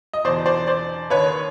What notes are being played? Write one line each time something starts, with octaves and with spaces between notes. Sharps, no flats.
D#5
E2 B2 C5 D5
C5 D5
C5 D5
D#2 D#3 B4 C#5